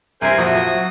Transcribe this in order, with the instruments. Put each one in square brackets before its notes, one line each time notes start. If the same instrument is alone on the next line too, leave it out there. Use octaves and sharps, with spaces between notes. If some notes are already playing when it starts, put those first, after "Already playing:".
[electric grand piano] G2 [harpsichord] C3 E4 [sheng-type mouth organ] A#4 C5 G#5
[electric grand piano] F2 A#2 F3 [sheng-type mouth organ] F#4 D#6
[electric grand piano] F3
F#3